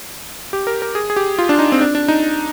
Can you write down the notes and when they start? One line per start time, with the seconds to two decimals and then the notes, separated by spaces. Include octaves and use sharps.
0.53 G4
0.67 A#4
0.82 A#4
0.95 G#4
1.10 G#4
1.16 G4
1.39 F4
1.49 D4
1.59 D#4
1.72 C4
1.81 D4
1.95 D4
2.08 D#4